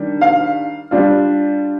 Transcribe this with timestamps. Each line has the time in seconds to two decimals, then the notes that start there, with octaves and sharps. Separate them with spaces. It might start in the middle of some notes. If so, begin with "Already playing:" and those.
Already playing: D#3 G3 D4
0.21 F5
0.91 G3 D4 F4